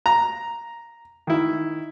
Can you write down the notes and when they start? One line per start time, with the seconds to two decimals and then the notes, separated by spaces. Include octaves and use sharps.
0.06 A#5
1.27 D#3 E4